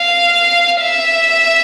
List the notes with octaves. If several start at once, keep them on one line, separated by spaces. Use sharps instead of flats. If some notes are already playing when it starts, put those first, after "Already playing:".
Already playing: F5
E5